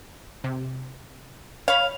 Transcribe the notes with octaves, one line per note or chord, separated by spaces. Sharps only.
C3
C#5 F5 B5